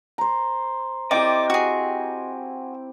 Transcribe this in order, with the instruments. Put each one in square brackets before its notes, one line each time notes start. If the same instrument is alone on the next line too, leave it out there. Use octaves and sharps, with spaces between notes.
[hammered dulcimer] C5 A#5
[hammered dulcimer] C4 E4 G4 [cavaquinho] D5 [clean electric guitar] D#5 G5
[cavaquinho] F#4 G#4